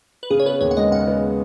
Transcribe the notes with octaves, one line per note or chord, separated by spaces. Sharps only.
B4
C#3 G#4
C#5
B3 B4
D#2 C#5
F#5
G#3 D#5
C#3 F#5
B3